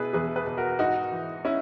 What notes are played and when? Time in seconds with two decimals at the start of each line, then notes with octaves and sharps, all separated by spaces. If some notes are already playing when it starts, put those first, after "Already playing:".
Already playing: B2 E4 G#4 B4
0.13 E2 G#4 B4
0.36 G#4 B4
0.46 B2
0.57 F#4 A#4
0.79 G#2 D#4 F#4
1.12 E3
1.45 C#4 E4